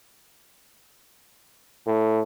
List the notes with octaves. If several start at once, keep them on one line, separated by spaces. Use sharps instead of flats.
A2